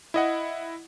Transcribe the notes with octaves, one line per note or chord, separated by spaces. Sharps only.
E4 D#5 F#5